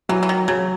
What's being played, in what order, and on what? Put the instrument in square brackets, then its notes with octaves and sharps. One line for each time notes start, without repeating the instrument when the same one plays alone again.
[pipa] E3 [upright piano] F#3
[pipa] E3
D#3
[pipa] C#3 [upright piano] F#3